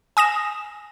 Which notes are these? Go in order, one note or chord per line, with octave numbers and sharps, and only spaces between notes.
G#5 D#6 A#6 E7